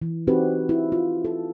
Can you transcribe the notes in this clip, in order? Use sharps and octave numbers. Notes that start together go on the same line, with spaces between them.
E3
C4 D#4 F#4 G4 B4
E4
F4
A4